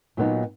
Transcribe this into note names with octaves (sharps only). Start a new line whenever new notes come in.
A#2 F#3 B3 D#4